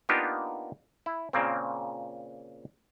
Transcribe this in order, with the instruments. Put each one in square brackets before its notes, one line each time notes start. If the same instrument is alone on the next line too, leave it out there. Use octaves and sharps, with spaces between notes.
[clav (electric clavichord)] A#3 B3 D4 D#4 F4 G4
E4
A#2 C#3 A#3 C4